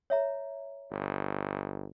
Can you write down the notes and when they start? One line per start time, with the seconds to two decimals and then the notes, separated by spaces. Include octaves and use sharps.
0.10 C#5 E5 A#5
0.91 G1